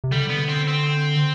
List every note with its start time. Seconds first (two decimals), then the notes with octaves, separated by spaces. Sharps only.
0.04 C3
0.12 D3 G3
0.30 B3
0.48 C4
0.67 C4